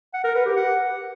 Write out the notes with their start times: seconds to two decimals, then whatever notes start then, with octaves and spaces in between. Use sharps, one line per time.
0.14 F#5
0.24 A#4
0.35 B4
0.46 G4
0.57 F#5